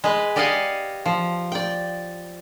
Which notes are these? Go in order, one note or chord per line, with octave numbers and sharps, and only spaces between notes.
G#3 B4
G4 D5 D#5 F5 F#5 G#5
F3
D5 G5